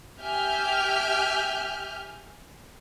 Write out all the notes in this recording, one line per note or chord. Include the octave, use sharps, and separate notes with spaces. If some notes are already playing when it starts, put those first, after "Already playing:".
G4 E5 G#5 F6 G6